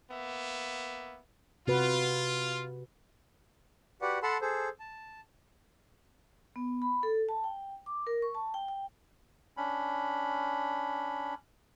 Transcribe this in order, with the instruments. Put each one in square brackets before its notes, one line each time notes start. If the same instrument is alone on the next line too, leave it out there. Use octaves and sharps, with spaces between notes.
[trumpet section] A#3 B3 E5
[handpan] C3 F#4 B4 [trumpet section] F4
[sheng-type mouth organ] F#4 G4 B4 D5 F#5
A4 F#5 A5 B5 C6
G#4 A4 C5
A5
[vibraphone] B3
B5
A4
A5
G5
D6
A#4
C#6
A5
G5
G5
[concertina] C#4 D4 B5